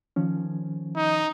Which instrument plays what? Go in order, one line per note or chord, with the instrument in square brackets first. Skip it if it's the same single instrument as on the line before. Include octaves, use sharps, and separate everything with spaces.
[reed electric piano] D#3 F3 C#4
[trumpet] D#4